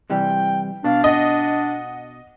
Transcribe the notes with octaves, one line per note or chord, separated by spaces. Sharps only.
C3 E3 G3 G5
B2 D4 F5
D#5 F#5